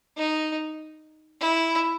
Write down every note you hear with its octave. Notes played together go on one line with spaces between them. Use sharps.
D#4
E4